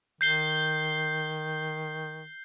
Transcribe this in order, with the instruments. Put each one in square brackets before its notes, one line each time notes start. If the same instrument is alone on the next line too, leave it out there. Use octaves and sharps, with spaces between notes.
[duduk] D#3 [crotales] G6 C7 G7